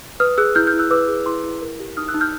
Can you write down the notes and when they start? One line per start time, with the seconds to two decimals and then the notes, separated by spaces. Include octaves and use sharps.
0.20 B4 D#6 F6
0.38 G#4 E6 F#6
0.55 E4 F6 G6
0.67 F6 G6
0.74 E4
0.79 E6 F#6
0.91 B4 D6 E6
1.08 G#4
1.26 E4 C6 D6
1.44 E4
1.62 A#4
1.80 G4
1.97 D#4 D#6 F6
2.08 E6 F#6
2.14 D#4
2.21 F6 G6